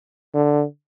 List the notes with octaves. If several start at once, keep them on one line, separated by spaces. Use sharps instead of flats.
D3